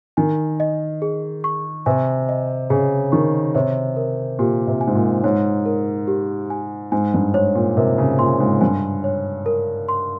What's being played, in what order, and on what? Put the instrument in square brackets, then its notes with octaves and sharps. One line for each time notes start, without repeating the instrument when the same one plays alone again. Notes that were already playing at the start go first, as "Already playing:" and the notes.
[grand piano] D#3 [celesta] G#5
[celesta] D#5
G#4
C#6
[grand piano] C3 [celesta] G#5
[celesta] D#5
[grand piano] C#3 [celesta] G#4
[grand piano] D#3 [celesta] C#6
[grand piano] C3 [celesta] C#5
[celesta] A#4
[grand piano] A#2 [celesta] G4
[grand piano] C3
[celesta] G#5
[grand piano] G#2
A#2
[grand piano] G#2 [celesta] C#5
[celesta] A#4
G4
G#5
[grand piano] G#2 [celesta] G#5
[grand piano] G2
[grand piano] G#2 [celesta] C#5
[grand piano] A#2
[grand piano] C3 [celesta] A#4
[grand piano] C#3
[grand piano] A#2 [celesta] C6
[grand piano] G#2
[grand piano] G2 [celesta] G#5
[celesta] C#5
A#4
C6